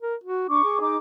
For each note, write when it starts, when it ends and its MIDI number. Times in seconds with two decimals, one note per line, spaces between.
0.02 0.15 70
0.23 0.49 66
0.49 0.64 62
0.49 0.77 85
0.49 0.77 86
0.64 0.98 68
0.80 0.96 63
0.80 0.96 86